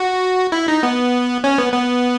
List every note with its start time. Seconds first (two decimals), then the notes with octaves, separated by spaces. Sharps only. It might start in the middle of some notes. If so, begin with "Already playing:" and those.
Already playing: F#4
0.52 E4
0.68 D#4
0.83 B3
1.44 C#4
1.58 B3
1.73 B3